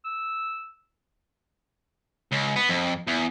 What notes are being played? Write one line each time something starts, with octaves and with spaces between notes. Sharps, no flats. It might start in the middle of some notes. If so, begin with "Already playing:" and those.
E6
C#2
B3
F2
E2